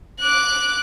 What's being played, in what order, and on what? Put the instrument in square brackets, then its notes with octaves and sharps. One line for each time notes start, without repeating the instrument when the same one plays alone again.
[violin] D6 F#6